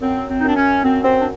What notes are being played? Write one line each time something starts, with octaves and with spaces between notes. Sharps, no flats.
F#2 C4
C4
F#2 D#4
D4
C#4
F#2 C4
C4
D4